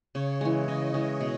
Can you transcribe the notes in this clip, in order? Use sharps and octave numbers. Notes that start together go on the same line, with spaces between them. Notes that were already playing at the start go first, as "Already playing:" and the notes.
C#3 C#5
E3 G#3
C#3 D#5
E3 G#3
B2